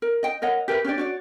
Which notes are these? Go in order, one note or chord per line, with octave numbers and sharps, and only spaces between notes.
A#4
D#5 G5
A#4 C#5 D#5 F#5
G4 A#4 B4 E5
C#4 D4 G4 D5
F#4 C#5 D5